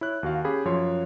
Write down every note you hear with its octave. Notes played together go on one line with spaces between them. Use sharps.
E4 C#5 F#6
D#2 F#4 F5
C#4 G4 G#4 B5
F#2 F3 C#5 C6